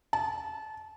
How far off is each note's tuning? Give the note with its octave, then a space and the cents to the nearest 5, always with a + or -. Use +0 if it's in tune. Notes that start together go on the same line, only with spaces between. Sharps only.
A5 -25